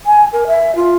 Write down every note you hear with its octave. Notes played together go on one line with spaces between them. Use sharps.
G#5
A#4
E5
F4